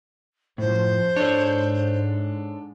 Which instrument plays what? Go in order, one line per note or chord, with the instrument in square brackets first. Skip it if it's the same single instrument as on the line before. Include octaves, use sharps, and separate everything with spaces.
[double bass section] F#2 F3 [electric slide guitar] A2 [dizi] C5
[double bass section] G#2 [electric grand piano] D4 [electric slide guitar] A4 C#5